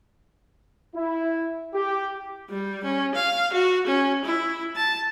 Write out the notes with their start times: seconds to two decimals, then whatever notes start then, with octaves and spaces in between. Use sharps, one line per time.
0.95 E4
1.74 G4
2.49 G3
2.84 C#4
3.15 F5
3.53 F#4
3.87 C#4
4.24 E4
4.76 A5